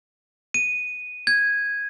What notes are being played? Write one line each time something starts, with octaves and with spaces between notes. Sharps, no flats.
D#7
G#6